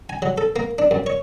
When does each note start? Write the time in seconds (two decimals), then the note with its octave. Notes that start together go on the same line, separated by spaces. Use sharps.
0.09 G#5
0.22 F#3
0.38 A4
0.56 A#3
0.79 D4
0.91 F#2
1.06 C#5